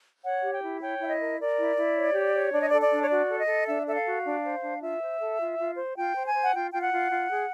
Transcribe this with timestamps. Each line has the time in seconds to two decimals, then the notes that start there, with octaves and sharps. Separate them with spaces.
0.24 C#5 F#5
0.43 G4
0.52 G5
0.63 E4
0.81 C#5 G5
0.99 E4 E5
1.09 D#5
1.20 A#4
1.38 A#4 D5
1.57 E4
1.77 E4
1.96 C#5
2.14 G4
2.34 C#5
2.52 D4 D5
2.60 D#5
2.69 A4 D5
2.81 D5
2.91 D4
3.02 C#5
3.09 F#4 D5
3.29 A4
3.38 D#5
3.47 A4
3.66 D4 E5
3.86 A4 E5
3.95 F5
4.05 F#4
4.24 D4
4.43 C5
4.62 D4
4.81 F4 E5
5.01 C5
5.19 A4
5.39 F4
5.58 F4
5.76 C5
5.96 F4 G5
6.14 C5
6.25 G#5
6.33 C5
6.43 F#5
6.52 F4 G5
6.71 F4 G5
6.81 F#5
6.91 F4
7.11 F4
7.30 G#4